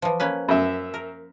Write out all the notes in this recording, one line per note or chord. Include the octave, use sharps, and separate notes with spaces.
E3 F3
A#3 C#4 B4
F#2 E5
A#4